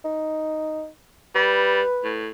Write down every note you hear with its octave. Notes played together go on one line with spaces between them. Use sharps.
D#4
G3 B4
A2